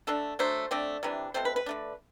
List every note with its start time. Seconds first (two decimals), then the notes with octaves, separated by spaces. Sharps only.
0.07 D3 A3 D4 A4
0.39 F#3 A3 D4 C5
0.71 D3 A3 C4 D5
1.03 C3 E3 G3 D4
1.34 B2 A3 C4 C5
1.45 B4
1.56 B4
1.66 D3 A3 D4